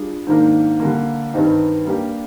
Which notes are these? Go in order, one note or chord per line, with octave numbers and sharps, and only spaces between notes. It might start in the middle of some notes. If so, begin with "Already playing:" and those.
Already playing: G3 D4 F4 G#4
G#2 D#3 A#3 D4
D3 G3 A#3
G2 D#3 G3 C4 D#4
G3 A#3 D4 G4